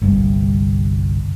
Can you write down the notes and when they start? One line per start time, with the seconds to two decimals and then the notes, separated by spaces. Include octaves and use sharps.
0.02 G1 C2 G2